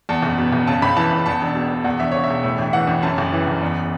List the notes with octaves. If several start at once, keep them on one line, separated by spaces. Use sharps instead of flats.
E2 A5
F#1
B2
F#1
C#3 A5
C#2 B5
E3 A5
C#2
E2 A5
E1
B2
E1
E2 F#5
E1 E5
C#3 C#5
E5
E1
A2
A1
E3 F#5
A1
F#2 A5
F#1
E3
F#1
E2